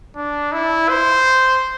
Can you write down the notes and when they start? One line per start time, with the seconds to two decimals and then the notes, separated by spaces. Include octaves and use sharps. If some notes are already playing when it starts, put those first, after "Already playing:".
0.16 D4
0.53 E4
0.89 C5